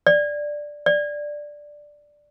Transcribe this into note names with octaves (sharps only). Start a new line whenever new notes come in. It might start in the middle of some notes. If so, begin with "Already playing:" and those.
D5
D5